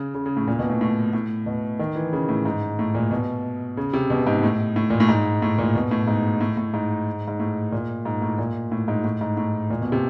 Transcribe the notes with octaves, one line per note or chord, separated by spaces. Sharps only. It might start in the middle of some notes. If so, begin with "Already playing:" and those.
Already playing: C#3
C#3
C#3
A2
A#2
B2
A2
A2
A2
B2
D#3
E3
C#3
A2
G#2
A2
A#2
B2
C#3
C3
B2
G#2
A2
A2
A#2
A2
G#2
A2
A#2
B2
A2
G#2
A2
A2
G#2
G#2
A2
A#2
G#2
A2
A#2
A2
G#2
A2
G#2
A2
A#2
B2
C3